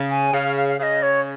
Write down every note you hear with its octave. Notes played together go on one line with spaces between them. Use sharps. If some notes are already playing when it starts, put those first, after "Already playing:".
Already playing: C#3
G#5
C#3 F5
F5
F5
C#3 D#5 F5
C#5